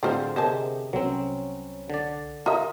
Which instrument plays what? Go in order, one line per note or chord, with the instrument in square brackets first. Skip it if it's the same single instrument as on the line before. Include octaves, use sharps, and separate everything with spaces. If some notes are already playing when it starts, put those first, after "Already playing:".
[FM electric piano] A2 G#4 F5 [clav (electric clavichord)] D3 [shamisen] C4 F4 C5
[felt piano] C3 G4 G#4 [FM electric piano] A#4 D#5 [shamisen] C5 G#5 A5
[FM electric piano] C2 [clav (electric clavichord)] F#3 C4 [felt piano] C#4 B4
[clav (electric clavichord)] D3 D5
[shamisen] F4 E5 [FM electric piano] A#4 [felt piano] A#5 D#6